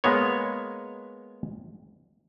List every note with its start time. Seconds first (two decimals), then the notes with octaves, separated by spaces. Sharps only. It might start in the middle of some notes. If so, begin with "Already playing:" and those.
0.04 G#3 A#3 B3 C#5